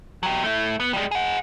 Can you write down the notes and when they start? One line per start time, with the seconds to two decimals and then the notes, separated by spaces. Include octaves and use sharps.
0.23 F#3 G4
0.44 A3 E4
0.80 B3
0.93 G3 G#3
1.11 G#4 F#5